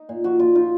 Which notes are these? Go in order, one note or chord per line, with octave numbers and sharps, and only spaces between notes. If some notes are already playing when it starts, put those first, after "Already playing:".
Already playing: D#4
A#2
F3 F#4
A#2 F4
D#4 F4